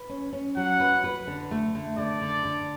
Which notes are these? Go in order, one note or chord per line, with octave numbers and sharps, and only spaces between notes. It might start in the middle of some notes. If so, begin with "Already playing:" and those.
Already playing: B4
C#4
C#4
F#3 F#5
B4
B4
D3
A3
D3
D3 D5
D3
D3